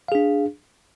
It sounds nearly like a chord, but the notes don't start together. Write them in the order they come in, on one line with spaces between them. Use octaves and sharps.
F5 G#4 D4